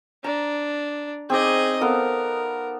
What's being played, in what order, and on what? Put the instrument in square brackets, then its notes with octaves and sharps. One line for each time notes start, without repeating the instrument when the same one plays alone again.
[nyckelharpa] D4 [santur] A#5
[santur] C4 D#4 D5 [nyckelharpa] G#4 D#5
[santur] B3 A4 F5 [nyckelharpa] A#4